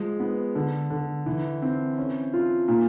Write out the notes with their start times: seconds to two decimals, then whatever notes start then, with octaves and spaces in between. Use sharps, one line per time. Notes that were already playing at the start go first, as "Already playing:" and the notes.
Already playing: F3 G#3
0.20 B3
0.55 D3
0.90 D3
1.26 E3
1.62 C4
1.98 C#4
2.34 F4
2.68 A#2